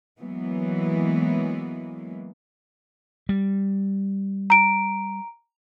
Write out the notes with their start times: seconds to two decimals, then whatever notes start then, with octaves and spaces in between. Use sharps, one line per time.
0.20 E3 F#3 G#3 A#3 B3
3.29 G3
4.50 A#5 D7